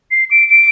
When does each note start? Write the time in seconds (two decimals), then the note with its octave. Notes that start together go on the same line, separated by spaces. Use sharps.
0.11 C7
0.31 D7
0.50 D7